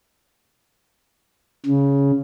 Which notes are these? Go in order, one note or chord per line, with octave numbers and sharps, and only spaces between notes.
C#3